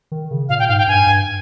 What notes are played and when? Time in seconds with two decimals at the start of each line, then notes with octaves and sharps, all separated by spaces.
0.12 D#3
0.31 C#3
0.49 A#2 F5
0.59 G5
0.68 G#2 F5
0.78 G5
0.87 G2 G#5
1.07 G2